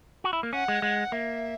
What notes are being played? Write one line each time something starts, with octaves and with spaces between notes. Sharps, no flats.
F#4
E4
A#3
C#4 F#5
G#3
G#3 F#5
A#3 E5